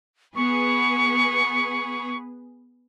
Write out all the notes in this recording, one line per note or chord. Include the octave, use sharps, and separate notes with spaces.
B3 G#4 B4 C#6